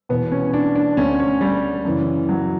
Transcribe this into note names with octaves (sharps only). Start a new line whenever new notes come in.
E2 B2 B3
C#4
D4
D4
D2 D3 C#4
C#4
G3
F#2 C#3 E3
F#3